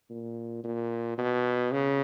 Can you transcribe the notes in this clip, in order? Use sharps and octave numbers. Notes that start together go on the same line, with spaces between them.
A#2
A#2
B2
C#3